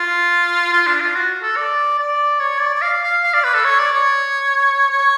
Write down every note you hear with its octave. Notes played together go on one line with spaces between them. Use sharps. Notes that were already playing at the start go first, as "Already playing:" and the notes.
Already playing: F4
F4
D4
F4
F#4
A4
D5
D5
C#5
D5
D5
F5
F5
F5
D5
B4
A4
C#5
D5
C#5
C#5